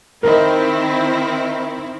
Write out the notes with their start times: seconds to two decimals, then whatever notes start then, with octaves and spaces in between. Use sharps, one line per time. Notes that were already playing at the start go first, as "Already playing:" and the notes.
0.23 D#3 C4 E4 A#4 D#5